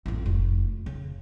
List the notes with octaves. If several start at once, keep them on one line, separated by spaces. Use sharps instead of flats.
A1 F2
F1
C#3